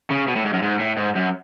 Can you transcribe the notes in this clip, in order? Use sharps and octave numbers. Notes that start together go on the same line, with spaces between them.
C#3
B2
A2
G#2
F#2
G#2
A2
G#2
F#2